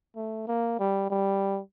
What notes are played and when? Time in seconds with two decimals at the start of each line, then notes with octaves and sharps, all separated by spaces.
0.16 A3
0.48 A#3
0.79 G3
1.10 G3